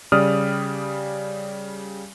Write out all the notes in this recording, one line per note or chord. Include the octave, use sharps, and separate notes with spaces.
C#3 G3 D5 D#6 F6